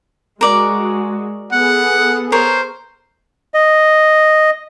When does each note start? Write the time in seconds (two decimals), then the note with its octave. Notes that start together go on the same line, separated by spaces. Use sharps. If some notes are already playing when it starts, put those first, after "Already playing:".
0.41 G#3 F#4 A#4 D5
1.52 B3 G#4 A4 F#5
2.32 A#4 C5 C#5
3.54 D#5